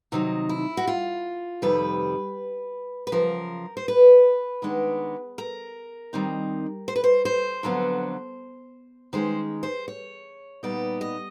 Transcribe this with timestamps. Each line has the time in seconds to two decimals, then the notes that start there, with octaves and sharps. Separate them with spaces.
0.12 C3 D#3 F#3 D#4
0.49 E4
0.77 F#4
0.87 F4
1.62 F2 C3 D#3 G3 B4
3.07 B4
3.12 F#2 C#3 F3 A#4
3.77 C5
3.88 B4
4.62 D#3 G#3 B3 D4
5.38 A#4
6.13 D#3 G3 C4 D#4
6.88 C5
6.96 B4
7.04 C5
7.25 C5
7.63 F2 D3 F#3 B3 D4
9.13 D#3 G#3 C#4 C5
9.63 C5
9.88 C#5
10.63 A#2 G3 B3 D#4 D5
11.01 D#5